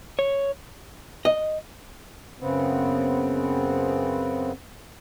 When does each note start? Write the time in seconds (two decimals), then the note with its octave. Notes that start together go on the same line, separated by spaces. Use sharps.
0.19 C#5
1.25 D#5
2.40 F#2 C#3 B3 C4